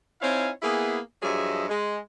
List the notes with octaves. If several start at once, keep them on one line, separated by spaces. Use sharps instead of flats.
C4 D#4 E4 C#5 F5 G#5
A#3 B3 E4 G#4
G2 F3 F#3 G#4 D#5 E5
G#3